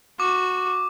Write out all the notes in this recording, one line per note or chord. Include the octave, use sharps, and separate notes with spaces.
F#4 D6